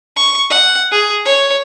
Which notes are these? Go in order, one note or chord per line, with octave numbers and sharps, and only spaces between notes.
C#6
F#5
G#4
C#5